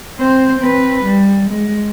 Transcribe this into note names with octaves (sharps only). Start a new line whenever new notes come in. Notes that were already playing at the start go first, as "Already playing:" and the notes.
C4 C5
C4 B4
G3
G#3